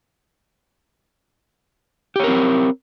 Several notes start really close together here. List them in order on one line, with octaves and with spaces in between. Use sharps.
G4 C#5 A#4 C4